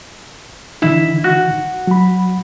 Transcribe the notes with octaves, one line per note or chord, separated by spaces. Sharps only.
D3 E3 D#4 E4
F#4
F#3 B5